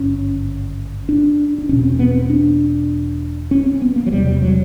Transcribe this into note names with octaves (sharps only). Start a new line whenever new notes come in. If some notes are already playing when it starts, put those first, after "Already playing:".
Already playing: G#1 G2 D3 C#4
D4
D4
E1 E2 B2 C#4
C4
B3
C4
D4
C#4
C4
B3
A#3
F#3
E1 E2 C3 G3
G3
F#3